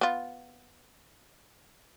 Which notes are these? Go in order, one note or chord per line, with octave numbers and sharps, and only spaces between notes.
B3 F4